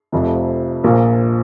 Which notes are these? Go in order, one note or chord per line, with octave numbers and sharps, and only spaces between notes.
F1 F2 C3 F3
A#1 A#2 F3 A#3